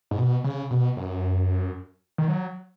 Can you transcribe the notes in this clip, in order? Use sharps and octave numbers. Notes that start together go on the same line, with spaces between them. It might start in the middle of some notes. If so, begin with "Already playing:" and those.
G#2
B2
C#3
B2
F#2
D#3
F#3